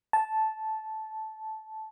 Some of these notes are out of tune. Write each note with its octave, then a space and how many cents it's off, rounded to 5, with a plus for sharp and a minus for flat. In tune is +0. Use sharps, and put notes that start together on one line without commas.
A5 -10